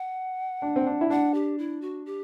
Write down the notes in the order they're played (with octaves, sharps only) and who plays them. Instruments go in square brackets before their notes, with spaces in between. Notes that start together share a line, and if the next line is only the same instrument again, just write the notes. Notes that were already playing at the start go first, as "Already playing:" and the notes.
Already playing: [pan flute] F#5
[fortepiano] D4
C4
D4
E4
[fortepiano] D4 [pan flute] F#5
[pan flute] G4
E4
F#4
G4